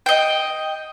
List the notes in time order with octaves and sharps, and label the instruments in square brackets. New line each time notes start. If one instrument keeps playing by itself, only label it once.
[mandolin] D#5 G5